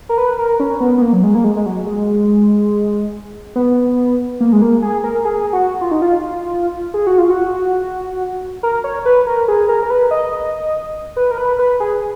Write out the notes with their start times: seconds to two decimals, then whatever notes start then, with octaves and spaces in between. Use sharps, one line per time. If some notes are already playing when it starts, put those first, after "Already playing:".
0.09 A#4
0.18 B4
0.39 A#4
0.60 C#4
0.80 B3
0.98 B3
1.02 A#3
1.13 F#3
1.23 G#3
1.35 A#3
1.44 G#3
1.56 G#3
1.66 F#3
1.86 G#3
3.56 B3
4.40 A#3
4.53 G#3
4.62 A#3
4.82 G#4
5.04 A#4
5.25 G#4
5.53 F#4
5.81 F4
5.91 D#4
6.02 F4
6.94 G#4
7.07 F#4
7.18 F4
7.30 F#4
8.63 A#4
8.84 C#5
9.06 B4
9.27 A#4
9.48 G#4
9.68 A#4
9.83 A#4
9.90 B4
10.11 D#5
11.17 B4
11.31 A#4
11.38 B4
11.59 B4
11.80 G#4